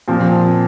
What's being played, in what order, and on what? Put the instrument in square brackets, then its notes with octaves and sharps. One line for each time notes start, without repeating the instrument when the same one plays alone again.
[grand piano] A#2 F3 C4